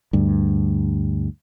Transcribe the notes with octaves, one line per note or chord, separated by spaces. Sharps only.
D2 G2